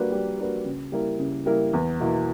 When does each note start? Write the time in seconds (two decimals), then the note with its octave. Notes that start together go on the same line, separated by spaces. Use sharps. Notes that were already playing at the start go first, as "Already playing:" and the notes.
Already playing: G3 A#3 D4 F#4 B4
0.12 G3
0.39 A#3 D4 F#4 B4
0.65 C#3
0.92 G3 A#3 E4 A#4
1.19 C#3
1.46 G3 A#3 E4 A#4
1.73 E2
2.00 B2 A#3 E4